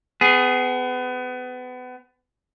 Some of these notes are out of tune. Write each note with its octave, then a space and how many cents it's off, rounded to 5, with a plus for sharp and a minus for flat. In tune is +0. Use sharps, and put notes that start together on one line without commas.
B3 +30 G#4 +5